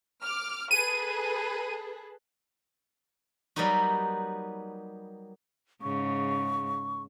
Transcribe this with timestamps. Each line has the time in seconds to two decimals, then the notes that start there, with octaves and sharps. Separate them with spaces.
0.21 D6 F6
0.71 G#4 A4 B4 D#7
3.56 F#3 G3 A#3 B3 D#4 F#4
5.82 G#2 C#3 C#6